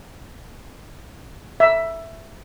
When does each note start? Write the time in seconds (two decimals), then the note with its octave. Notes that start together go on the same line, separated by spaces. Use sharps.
1.60 E5